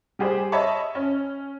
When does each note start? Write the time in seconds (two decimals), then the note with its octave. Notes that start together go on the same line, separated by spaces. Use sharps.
0.19 G3 G4 G#4 C5
0.52 C#5 D#5 E5 A5 B5 C#6
0.95 C#4